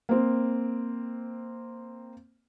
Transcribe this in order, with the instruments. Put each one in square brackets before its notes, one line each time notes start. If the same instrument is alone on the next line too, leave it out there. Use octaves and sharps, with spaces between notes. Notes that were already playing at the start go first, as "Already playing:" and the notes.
[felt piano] A#3 C4